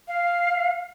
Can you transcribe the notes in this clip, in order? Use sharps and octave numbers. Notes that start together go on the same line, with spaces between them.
F5